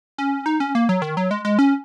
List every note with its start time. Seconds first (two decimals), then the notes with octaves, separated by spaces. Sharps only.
0.18 C#4
0.46 D#4
0.60 C#4
0.75 A#3
0.89 F#3
1.02 D#3
1.17 F#3
1.31 G#3
1.45 G#3
1.59 C#4